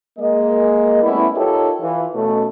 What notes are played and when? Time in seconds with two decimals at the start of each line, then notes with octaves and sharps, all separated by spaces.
0.18 G#3 A#3 D#5
1.02 G3 A3 B3 C#4 E4
1.35 D#4 F4 G4 A4 A#4 C#5
1.80 E3 F4
2.14 B2 A3 C#4